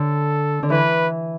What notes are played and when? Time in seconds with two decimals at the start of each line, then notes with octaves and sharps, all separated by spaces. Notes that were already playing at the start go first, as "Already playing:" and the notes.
Already playing: D3 A4
0.63 D3
0.70 E3 B4